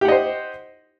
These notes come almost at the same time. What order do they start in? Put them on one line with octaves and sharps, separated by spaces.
G4 F#5 D#5 C5